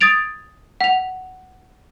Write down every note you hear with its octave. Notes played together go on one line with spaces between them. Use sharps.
D#6 G#6 A6 D7 F7
F#5 F7